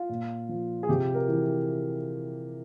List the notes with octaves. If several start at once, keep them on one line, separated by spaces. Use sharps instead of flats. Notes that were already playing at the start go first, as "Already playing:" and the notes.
Already playing: F4
A#2
F3
G#4
C3 G4
A#4
E3